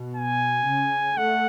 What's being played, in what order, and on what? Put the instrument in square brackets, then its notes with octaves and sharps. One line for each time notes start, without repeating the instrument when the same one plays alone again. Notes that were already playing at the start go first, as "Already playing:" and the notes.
Already playing: [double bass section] B2
[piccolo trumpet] G#5
[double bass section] C#3
[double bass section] A3 [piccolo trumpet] F#5